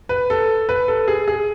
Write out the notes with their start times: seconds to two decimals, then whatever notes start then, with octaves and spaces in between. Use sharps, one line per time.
0.09 B4
0.30 A4
0.69 B4
0.88 A4
1.08 G#4
1.28 G#4